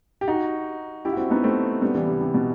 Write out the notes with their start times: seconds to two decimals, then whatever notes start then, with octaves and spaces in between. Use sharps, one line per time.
0.21 G4
0.27 D#4 F#4
1.05 E4 G4
1.13 F#4
1.17 C4 E4
1.30 B3 D#4
1.43 A3 C4
1.82 G3 B3
1.95 E3 G3
2.07 C3
2.21 C3
2.34 B2